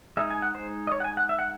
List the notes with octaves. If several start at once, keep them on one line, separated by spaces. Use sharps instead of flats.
G#3 D#4 E5
G#5
F#5
C5
D#5
C#5
F#5
G#5
F#5
E5
F#5